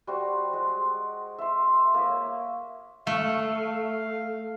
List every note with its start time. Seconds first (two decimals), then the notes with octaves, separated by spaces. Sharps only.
0.07 G3 F#4 C5 F#5
0.53 G#3
1.38 E5 C6
1.94 A#3 C#5 E5
3.07 A3 F5